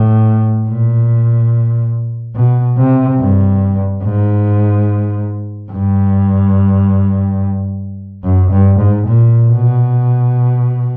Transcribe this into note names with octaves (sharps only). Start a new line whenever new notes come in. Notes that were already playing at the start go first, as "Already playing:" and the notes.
Already playing: A2
A#2
B2
C3
G2
G#2
G2
F#2
G2
G#2
A#2
B2